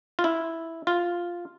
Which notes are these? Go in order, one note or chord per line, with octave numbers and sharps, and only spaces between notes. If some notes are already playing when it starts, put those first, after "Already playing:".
F4
E4
F4